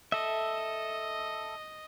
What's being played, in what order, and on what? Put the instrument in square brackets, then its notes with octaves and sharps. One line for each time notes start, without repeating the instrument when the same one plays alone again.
[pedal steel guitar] A4 E5 [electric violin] D#5